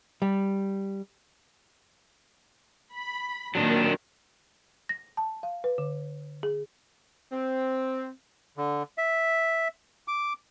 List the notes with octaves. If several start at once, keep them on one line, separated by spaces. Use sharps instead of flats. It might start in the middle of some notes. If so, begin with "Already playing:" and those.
G3
B5
A#2 D#3 F#3 D4
A#6
A5
F5
B4
D3
G#4
C4
D3
E5
D6